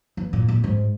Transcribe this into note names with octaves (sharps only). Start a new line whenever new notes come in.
E3
A#2
A#2
G#2